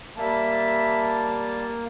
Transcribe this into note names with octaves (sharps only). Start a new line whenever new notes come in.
G3 A#3 E5 A5